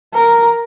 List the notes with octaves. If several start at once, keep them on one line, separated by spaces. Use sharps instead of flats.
A#4